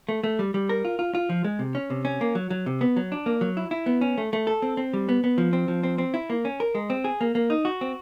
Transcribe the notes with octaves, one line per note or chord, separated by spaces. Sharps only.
A3
A3
G3
G3
A#4
F4
F4
F4
F3
G#3
C3
C#4
C3
C#4
A#3
F#3
F#3
C3
B3
F#3
D4
A#3
F#3
E4
E4
B3
C#4
A3
A3
A4
C4
C4
G3
B3
B3
F3
C4
F3
C4
C4
E4
A#3
C#4
A#4
G#3
C4
G#4
A#3
A#3
D#4
F#4
C4